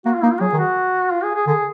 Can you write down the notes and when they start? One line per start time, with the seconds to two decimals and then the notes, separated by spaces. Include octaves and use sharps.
0.05 A#3 F#4
0.14 F4
0.23 A#3 D#4
0.32 F4
0.41 F#3 G#4
0.53 D#3
0.58 F#4
1.11 F4
1.24 G#4
1.35 G#4
1.47 D3 G#4